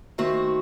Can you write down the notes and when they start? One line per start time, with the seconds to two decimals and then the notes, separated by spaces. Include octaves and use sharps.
0.18 D#3 A3 C4 F#4